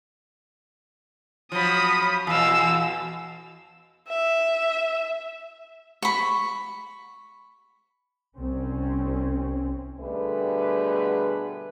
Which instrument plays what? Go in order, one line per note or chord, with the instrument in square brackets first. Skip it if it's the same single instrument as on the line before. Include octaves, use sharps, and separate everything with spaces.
[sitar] F3 F#3 [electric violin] B5 D#6
[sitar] E2 B2 [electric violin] F5 E6
[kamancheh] E5
[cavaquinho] B5 C#6
[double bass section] C2 C4 C#4
[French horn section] B2 D3 G3 A3 G#4 B4